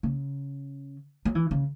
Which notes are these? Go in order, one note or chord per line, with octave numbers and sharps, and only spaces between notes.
C#3
F#3
E3
C#3